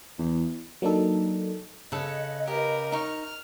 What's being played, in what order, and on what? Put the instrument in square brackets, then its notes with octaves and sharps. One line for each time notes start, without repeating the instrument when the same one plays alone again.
[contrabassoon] E2
[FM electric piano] F#3 A#3 D4 D#4 A4
[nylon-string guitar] C#3 [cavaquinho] A4 B4 [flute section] D#5
[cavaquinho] G4 [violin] A#4 B4
[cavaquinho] D#4 C#6 [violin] F6